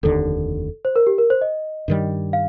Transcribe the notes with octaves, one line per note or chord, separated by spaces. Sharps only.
F1 D#2 D3 A4
C5
A#4
G4
A#4
C5
D#5
G2 D#3 G3
F5